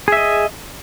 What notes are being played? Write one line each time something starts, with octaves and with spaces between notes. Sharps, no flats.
G#4 D#5 E5